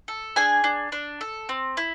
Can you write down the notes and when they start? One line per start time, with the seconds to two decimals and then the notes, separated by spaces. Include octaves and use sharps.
0.08 A4
0.36 D4 G#4 G#5
0.64 D4
0.92 D4
1.21 A4
1.49 C4
1.77 E4